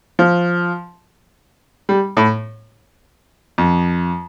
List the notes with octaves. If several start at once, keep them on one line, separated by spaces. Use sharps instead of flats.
F3
G3
A2
F2